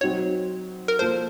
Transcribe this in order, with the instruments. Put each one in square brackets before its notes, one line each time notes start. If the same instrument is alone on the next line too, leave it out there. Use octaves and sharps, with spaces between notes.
[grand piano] F#3 C4 D#4 F#4 [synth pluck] C#5
[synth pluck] A#4
[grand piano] F3 A#3 F4 A4 [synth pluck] C5